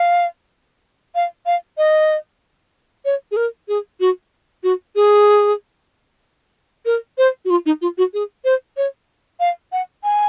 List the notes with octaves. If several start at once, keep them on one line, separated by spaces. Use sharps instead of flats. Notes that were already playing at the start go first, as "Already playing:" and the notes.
Already playing: F5
F5
F5
D#5
C#5
G#4
A#4
G#4
F#4
F#4
G#4
A#4
C5
F#4
F4
D#4
F4
F#4
G#4
C5
C#5
F5
F#5
G#5